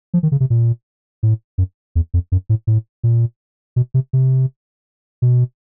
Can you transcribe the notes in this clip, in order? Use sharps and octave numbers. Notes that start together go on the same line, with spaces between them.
F3
D#3
C#3
C3
A#2
A2
F#2
E2
F2
F#2
A2
A2
A#2
B2
C3
C3
B2